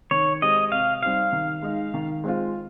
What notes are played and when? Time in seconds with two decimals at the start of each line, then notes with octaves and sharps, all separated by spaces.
0.11 D#3 C#5
0.42 G#3 C4 G4 D#5
0.72 C3 F5
1.03 G3 C4 D#4 G4 F5
1.33 D#3
1.62 G#3 D#4
1.94 D#3
2.24 G#3 C4 F4